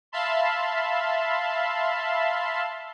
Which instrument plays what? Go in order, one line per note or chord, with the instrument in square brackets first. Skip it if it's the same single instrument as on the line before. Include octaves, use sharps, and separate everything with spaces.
[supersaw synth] E5 F5 A5 B5 C6